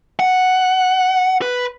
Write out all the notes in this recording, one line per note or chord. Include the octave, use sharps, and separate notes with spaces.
F#5
B4